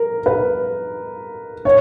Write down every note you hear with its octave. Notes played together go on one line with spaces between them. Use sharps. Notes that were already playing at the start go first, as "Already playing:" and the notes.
Already playing: A#4
B4
C#5